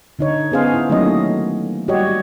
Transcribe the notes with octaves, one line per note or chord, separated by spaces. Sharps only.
D3 D#4 C#5
B3 C#4 G#4 C5 F5
E4
D#3 F#3 A3 A#3 C#4 D#5
G3 F#4 G4 C#5 D#5